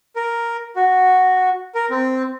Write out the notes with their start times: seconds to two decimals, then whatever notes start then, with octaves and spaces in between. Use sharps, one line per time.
0.16 A#4
0.76 F#4
1.75 A#4
1.90 C4